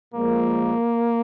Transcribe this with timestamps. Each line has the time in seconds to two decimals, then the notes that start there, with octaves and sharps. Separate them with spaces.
0.14 A#2 F3 G#3 A#3